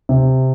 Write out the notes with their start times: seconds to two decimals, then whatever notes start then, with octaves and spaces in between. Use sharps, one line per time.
0.09 C3